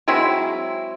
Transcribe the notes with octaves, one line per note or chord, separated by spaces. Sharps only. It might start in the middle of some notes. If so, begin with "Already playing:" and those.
F#3 G#3 C4 E4